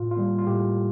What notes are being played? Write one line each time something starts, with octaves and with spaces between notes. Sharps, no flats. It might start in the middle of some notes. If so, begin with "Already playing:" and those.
Already playing: A2 F4
F4
G3 A#3
F4
A2 G4